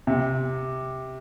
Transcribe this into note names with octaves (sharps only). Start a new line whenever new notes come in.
C3